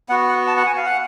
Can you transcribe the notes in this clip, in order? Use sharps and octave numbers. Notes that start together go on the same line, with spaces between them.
B3 F#4 F#5
F#5
A5
F#5
G#5
F5
F#5